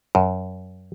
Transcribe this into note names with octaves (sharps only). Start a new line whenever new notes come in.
F#2